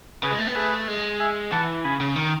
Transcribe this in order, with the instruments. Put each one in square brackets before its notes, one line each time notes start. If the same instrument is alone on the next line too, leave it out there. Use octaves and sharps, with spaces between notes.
[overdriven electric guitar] C#3 [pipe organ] G#4 B4
[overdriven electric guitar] G#3
A3
B3
[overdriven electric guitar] A3 [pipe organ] G#4 B4
[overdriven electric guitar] G#3
[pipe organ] E5 G#5
[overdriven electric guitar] E3 [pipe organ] F#5 A5
[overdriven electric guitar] C#3 [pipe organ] G#5 B5
[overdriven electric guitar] C#3
D#3